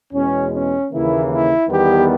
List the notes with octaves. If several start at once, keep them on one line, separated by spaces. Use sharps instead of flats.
E2 B2 G#3 C#4
C#4
D#2 C#3 E3 A#3 E4
E4
E2 D#3 G3 B3 G4